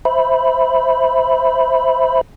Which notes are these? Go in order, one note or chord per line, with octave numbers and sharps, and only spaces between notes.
C5 E5 B5